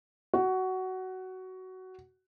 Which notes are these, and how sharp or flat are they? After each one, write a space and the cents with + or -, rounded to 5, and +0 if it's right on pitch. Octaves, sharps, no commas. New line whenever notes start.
F#4 +15